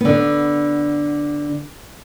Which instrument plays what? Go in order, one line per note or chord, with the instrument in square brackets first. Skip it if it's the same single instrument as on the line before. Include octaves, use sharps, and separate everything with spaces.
[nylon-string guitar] D3 B3